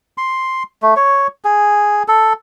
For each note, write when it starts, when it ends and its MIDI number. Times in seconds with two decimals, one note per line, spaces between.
0.18 0.63 84
0.82 0.94 57
0.96 1.27 73
1.44 2.03 68
2.08 2.33 69